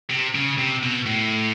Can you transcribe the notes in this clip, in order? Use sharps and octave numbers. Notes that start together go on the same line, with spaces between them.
C3
C#3
C3
B2
A2